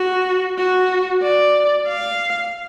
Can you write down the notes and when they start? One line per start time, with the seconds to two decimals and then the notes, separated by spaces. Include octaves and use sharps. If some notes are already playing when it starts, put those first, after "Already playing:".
Already playing: F#4
0.58 F#4
1.23 D5
1.88 F5